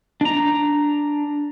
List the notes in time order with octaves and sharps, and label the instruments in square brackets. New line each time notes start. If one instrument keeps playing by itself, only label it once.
[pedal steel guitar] D4 A#5